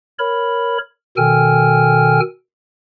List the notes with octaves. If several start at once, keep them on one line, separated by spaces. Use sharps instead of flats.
A#4 C#5 B5
B2 D#3 A4 G5 G#5 F6